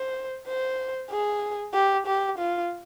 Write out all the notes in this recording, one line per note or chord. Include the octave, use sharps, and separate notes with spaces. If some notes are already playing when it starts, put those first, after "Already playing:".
Already playing: C5
C5
G#4
G4
G4
F4